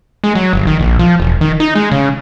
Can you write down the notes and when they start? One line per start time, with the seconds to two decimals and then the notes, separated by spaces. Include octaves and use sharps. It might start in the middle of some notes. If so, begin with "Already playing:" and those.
0.24 G#3
0.35 F#3
0.53 G1
0.67 D#3
0.80 A#1
0.99 F3
1.20 E1
1.41 D#3
1.60 D#4
1.75 G#3
1.92 C#3